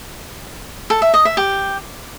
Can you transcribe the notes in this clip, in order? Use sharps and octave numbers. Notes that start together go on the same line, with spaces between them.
A4
E5
D#5
E5
G4